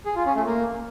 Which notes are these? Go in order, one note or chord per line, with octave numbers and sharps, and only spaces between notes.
G#4
F4
C#4
A3
A#3